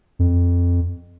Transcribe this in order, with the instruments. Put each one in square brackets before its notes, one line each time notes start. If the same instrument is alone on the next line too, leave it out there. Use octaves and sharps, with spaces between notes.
[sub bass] F2